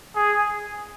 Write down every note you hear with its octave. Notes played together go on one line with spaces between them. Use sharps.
G#4